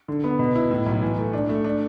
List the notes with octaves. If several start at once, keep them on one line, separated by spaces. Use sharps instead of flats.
D3
B3
B2
E4
A2
B1
E3
A3
D4
A3
D4